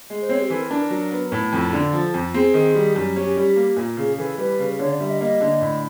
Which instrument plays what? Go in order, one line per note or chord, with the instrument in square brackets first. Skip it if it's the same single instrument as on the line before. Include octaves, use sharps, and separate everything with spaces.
[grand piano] G#3
[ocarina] C5
[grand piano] C4 [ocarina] C#5
[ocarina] G4
[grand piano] E3 [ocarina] A4
[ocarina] A#4
[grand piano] D4 [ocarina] A#4
[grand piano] F#3
B3
A2
[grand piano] F2 [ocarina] A4
[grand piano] D3
F3
F2
[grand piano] C4 [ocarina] G#4
[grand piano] D#3
G3
F#2
[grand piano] C#4 [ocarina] G4
[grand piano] G3
A#3
A#2
[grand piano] C#3 [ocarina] G#4
[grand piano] E3 [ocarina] A4
[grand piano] G3 [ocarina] B4
[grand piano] C#3
[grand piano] D3 [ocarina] C#5
[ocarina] D5
[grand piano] G3 [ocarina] E5
[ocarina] D#5
[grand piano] A#3 [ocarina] D#5
[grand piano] D3
A2